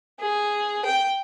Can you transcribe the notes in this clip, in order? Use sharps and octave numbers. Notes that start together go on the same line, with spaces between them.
G#4
G5